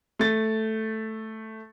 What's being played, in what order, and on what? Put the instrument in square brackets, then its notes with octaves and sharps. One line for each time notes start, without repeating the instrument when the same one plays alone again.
[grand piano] A3 A6